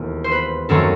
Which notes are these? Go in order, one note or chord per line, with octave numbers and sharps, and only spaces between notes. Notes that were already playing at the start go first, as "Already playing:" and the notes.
Already playing: E1 D#2 D#3 A3
C5
B4
F#2 D#3 A3 C4 A4